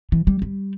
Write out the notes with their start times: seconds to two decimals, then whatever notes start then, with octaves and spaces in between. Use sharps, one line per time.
0.12 E3
0.27 G3
0.42 G3